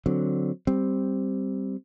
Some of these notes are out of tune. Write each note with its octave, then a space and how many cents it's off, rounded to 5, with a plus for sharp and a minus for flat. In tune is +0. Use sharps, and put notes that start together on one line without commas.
D3 +0 F#3 -10 C4 +0
G3 +0 C4 +0